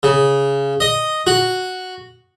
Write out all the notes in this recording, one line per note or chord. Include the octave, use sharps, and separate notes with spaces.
C#3
D#5
F#4